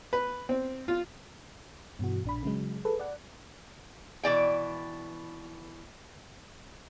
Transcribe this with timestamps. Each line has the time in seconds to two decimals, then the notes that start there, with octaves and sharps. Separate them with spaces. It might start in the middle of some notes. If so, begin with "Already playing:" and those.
0.13 B4
0.49 C4
0.88 F4
1.99 G2 B2 E3 F#4
2.24 A#1 D4 B5
2.43 C#3 F#3 G#3
2.85 G#4 A4 B4
3.00 D5 F#5
4.23 B2 E3 D5 G5